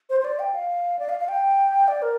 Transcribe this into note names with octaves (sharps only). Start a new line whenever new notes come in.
C5
C5
D5
G5
F5
D5
F5
F5
G5
D5
A#4